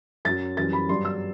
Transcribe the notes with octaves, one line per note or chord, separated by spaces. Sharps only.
F#2 F#3 A6
F#2 E3 G3 A6
B5
G2 F#3 C6
E6